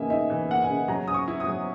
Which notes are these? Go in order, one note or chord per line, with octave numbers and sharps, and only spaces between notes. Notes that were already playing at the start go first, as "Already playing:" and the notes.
Already playing: C#3 E3 A#3 D#4 E5 G#5
D#4 E5
E3
A#3 F#5
G#5
C#3
F#3 A#5
C#4 D#6
C#6
E4
D#6
F#3